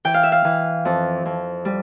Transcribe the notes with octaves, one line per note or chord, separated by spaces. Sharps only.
E3 G5
F5
E5
F5
E3
F2
F2
G3